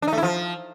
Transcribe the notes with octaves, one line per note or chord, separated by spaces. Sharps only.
D4
D#4
A3
E4
F3